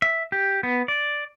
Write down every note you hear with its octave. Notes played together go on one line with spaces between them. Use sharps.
E5
G4
B3
D5